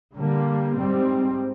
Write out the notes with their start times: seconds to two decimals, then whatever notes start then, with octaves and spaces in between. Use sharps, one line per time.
0.15 D3 G3 A#3
0.76 G#2 G3 C4